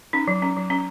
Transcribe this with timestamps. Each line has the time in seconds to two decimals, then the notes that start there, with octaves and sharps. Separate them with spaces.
0.13 C#4 D#4
0.28 F#3
0.42 C#4
0.57 F#3
0.70 C#4